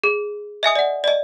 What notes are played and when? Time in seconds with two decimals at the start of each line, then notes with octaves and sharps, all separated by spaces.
0.04 G#4
0.63 D#5 E5 G#5 D#6
0.75 D5 F#5
1.04 D5 D#5